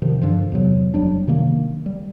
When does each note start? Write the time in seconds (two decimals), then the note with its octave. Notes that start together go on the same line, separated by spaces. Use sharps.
0.02 C3 D#3 F3
0.22 G2 D3 F3
0.52 E2 C3 F#3
0.94 F#1 F#3 G3 D4
1.27 C3 D#3 A#3
1.86 G3